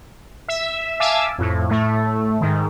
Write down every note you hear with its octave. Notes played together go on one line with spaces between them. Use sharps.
E5
E5 F5 G#5 A5 D6 E6
F2 A2
A2 A3
G#2 D#3